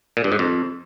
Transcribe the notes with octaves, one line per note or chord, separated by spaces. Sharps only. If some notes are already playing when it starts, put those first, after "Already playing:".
A#2
G2
G#2
F2